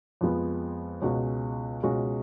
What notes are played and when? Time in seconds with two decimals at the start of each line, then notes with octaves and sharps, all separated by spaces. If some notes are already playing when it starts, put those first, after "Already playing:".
0.21 F2 F3 G#3 B3
1.02 C#2 B2 G#3 C#4 F#4
1.83 C#2 B2 G#3 C#4 F#4